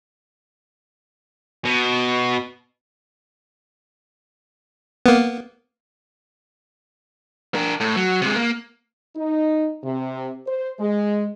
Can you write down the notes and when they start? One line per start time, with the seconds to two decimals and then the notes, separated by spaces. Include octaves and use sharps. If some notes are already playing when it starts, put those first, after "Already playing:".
1.65 B2
5.06 A#3 B3
7.55 D4 A#4
7.80 A2
7.96 F#3
8.22 C3 G#3
8.36 A#3
9.16 D#4
9.83 C3
10.47 C5
10.79 G#3